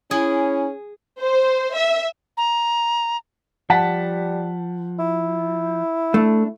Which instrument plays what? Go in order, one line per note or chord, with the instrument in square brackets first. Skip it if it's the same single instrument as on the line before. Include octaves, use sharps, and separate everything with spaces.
[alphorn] C#4 [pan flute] E4 [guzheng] G#4
[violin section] C5
E5
[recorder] A#5
[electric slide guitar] F3 [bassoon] G3 [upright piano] F#5 A5 B6
[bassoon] E4
[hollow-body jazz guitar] A3 [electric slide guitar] D4